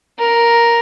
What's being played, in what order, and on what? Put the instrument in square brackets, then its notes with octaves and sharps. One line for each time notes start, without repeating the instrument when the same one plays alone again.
[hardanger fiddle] A#4